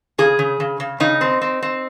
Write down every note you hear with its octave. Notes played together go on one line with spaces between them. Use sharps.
C#3 G#4
C#3
C#3
C#3
C#3 D#4
C4
C4
C4